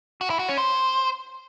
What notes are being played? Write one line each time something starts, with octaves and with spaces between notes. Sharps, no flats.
F#4
E4
F#4
C#4
C5